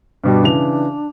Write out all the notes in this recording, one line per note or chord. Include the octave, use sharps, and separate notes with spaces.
G2 B2 G3 D4
C#3 E3 F7